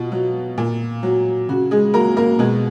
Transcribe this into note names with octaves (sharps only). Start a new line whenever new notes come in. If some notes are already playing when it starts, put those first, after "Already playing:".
Already playing: B2 F4
F#3
A#2
F#3
C#3 F#4
G#3 G#4
F#3 A#3 A#4
A#3 A#4
B2 G#3 G#4